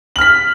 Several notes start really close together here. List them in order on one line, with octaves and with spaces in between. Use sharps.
F#7 F6 B6